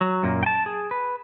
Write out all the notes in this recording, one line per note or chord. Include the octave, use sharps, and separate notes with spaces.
F#3
F#2 A#2 A#3
G5 A5
G#4
B4